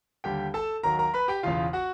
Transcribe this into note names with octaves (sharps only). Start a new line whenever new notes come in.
D#2 D3 G3 G4 G5
A4 A5
D#2 D#3 F#3 A#4 A#5
A#4 A#5
B4 B5
G4 G5
E1 E2 C#3 F4 F5
F#4 F#5